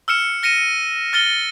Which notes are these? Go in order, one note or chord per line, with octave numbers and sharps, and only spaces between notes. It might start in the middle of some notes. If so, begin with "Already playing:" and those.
E6 F6 C#7 E7
F6 A#6 C#7 D#7 E7
F6 A6 C#7 G7